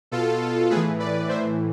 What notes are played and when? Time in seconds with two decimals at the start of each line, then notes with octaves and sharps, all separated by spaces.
0.11 B2 F4 A4
0.70 A2 G#4 B4
0.76 E3
1.00 B4 D5
1.29 A2 E3 C5 E5